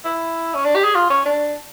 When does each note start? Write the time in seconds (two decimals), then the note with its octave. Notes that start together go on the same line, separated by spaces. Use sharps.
0.05 E4
0.54 C#4
0.65 D4
0.75 G4
0.84 G#4
0.95 F4
1.10 C#4
1.25 D4